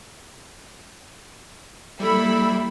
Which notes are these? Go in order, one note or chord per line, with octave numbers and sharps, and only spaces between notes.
G3 A#3 E4 A4 B5